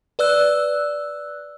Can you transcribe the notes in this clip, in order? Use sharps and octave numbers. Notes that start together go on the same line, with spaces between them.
B4 D5 E6 F#6